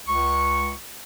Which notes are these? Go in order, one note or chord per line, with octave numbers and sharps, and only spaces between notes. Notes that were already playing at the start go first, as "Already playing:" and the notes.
C#2 C#6